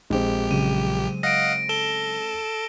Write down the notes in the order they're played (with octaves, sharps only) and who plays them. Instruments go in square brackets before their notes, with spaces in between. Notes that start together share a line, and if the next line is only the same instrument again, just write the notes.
[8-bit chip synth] A#1 G4 [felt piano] G#3 C4
[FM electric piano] C#3 F#3 [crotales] D#7
[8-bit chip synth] D#5 F5 F#5 [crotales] A#6 D7
[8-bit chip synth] A4 [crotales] E7 G7